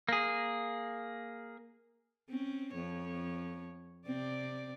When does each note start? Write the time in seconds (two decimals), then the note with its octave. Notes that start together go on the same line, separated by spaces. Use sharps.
0.09 A#3 G#4
2.30 C4 C#4
2.74 F2 C#5
4.07 C3 C4 D5